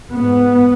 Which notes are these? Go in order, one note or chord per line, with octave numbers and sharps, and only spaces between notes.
G#2 B3